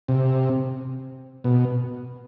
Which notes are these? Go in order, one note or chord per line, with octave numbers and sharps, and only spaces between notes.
C3
B2